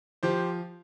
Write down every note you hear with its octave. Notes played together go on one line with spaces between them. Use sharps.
F3 G4 C5